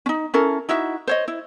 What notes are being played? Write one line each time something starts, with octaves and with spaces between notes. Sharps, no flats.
C#4 D#4
C#4 E4 A4 A#4
D#4 E4 F#4 E5
C5 C#5 D#5
E4